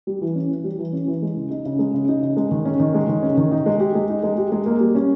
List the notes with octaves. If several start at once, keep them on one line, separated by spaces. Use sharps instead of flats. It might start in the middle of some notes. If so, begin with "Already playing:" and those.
G3
E3
C#4
E3
G3
E3
C#4
E3
G#3
C#3
D#4
C#3
G#3
C#3
D#4
C#3
G#3
D#3
C#4
D#3
G#3
D#3
C#4
D#3
D#4
G#3
G4
G#3
D#4
G#3
G4
G#3
A#3
G3
C#4